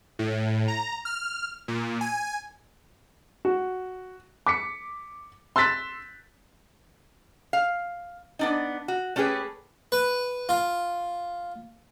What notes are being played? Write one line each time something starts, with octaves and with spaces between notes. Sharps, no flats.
A2
A#5
F6
A#2
G#5
F#4
D6 B6 C#7
C6 E6 F#6 A6 B6
F5
B3 D4 D#4
F#4
A3 C#4 G4 G#4 B4
B4
F4